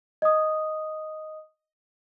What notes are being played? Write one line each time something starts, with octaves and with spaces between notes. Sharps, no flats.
D#5 D#6